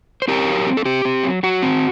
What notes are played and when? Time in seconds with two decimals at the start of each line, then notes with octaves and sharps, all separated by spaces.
0.22 C5
0.28 C4 G4 A#4
0.47 F#3
0.67 C4
0.77 A4
0.85 C4 G4
1.05 C4
1.24 F#3
1.43 F#3 F#4
1.62 C4